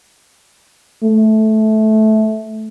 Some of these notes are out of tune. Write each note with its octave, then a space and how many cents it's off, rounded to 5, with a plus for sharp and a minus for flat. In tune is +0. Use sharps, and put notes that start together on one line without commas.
A3 -15